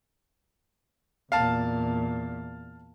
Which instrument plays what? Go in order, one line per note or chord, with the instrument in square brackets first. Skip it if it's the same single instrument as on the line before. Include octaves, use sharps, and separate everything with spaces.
[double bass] E2 A#2 [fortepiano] F5 A5